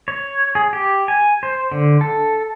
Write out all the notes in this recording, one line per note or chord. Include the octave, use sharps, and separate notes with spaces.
C#5
G#4
G4
G#5
C5
D3
A4